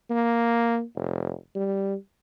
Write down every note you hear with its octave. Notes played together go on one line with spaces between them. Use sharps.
A#3
F1
G3